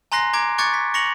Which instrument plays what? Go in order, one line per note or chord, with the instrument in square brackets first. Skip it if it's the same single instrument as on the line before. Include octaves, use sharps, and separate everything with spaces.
[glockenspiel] G#5 A#5 C6 F#6 A#6 C7
A#5 D6 G#6 D7
C#6 D6 F#6 G#6 A6 C#7
B6
C#6 A#6 C#7 F7 F#7